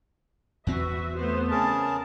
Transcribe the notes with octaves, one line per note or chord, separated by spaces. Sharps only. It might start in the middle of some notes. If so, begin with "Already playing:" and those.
E2 C4 F#4 B4 E5
A3 B3 C5
C#3 G#4 A#4 A5